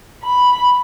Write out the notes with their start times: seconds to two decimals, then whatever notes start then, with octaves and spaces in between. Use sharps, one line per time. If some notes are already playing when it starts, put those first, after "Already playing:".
0.24 B5